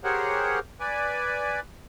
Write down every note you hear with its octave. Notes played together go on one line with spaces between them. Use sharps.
G4 G#4 A#4 C5 C#5 F#5
B4 D5 G#5